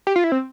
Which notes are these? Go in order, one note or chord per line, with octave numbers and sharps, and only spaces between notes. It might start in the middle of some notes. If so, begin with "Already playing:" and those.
G4
F4
E4
C4